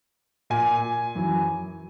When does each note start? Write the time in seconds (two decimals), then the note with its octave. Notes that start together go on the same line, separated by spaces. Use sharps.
0.50 A#2 G#5
1.15 F#2 E3